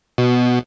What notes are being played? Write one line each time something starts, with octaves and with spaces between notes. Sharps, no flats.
B2